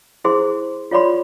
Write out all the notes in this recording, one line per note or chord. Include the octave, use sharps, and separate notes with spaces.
E4 G#4 C5 C6
F4 C#5 D5 B5 C6